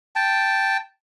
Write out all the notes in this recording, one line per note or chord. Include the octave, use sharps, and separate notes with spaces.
G5 A5